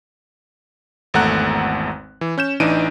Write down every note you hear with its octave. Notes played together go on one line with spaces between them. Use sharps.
G#1 E2 A3 F#5 A#5 F#6
E3
C#4 G6 E7
A1 E3 D4 D#4 D7 D#7